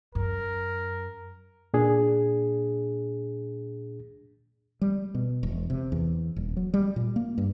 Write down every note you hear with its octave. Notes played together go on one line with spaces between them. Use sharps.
F#2 A#4
A#2 D4 G#4
G3
B2
E1
C3
E2
D#1
F#3
G3
A#2
A#3
G2